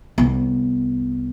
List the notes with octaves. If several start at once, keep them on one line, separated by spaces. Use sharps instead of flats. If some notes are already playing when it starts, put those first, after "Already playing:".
C2 B3